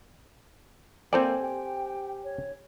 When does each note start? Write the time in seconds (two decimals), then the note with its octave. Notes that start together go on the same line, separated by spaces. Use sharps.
1.13 A#3 C4 A4 C5 D5 G5 G#5
1.42 G4 G5
2.24 C#5